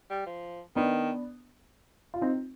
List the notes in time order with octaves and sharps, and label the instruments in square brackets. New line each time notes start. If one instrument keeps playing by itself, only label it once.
[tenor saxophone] G3
F3
[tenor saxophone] D#3 [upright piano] B3 D4
[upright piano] F4
C4 D#4